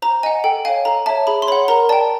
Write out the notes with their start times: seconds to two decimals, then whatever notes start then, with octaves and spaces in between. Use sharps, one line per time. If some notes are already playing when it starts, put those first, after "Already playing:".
0.02 C5 A#5
0.23 D#5 F#5 G#5
0.44 A4 G5
0.65 C#5 F5 G#5
0.85 A4 A#5
1.06 C#5 E5 A5
1.27 G#4 B5
1.42 C6
1.47 C#5 B5
1.52 F#5
1.68 A#4 A#5
1.89 D5 G5 A5